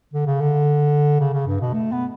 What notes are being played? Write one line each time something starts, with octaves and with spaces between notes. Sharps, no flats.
D3
C#3
D3
C#3
C#3
G2
B2
A3
B3